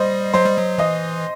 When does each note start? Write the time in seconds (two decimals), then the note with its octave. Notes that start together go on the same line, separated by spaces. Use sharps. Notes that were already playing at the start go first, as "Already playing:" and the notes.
Already playing: G3 C5 D#5
0.33 F#3 C5
0.45 G3
0.57 F#3
0.78 E3 D#5